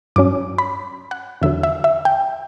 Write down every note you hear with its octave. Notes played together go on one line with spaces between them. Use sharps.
G2 F#3 C#4 D6
B5
F#5
E2 D3 F#3 E5
E5
E5
G5